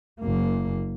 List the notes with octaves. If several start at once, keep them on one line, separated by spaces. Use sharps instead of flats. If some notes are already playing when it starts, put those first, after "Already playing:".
F#1 A#3